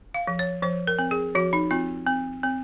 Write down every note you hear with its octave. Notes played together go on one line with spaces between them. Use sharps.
F5
F3
C#5
F3 C5
A#4
C4
G#4
F3 F#4
D#4
C4 F4
C4
C4